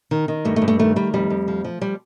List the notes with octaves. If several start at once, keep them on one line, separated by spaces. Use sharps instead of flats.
D#3
D#3
G2 A3
A3
G2
A3
D#3 A3
D#3 G3
F2 G3
F2
F3
F3
F3 G3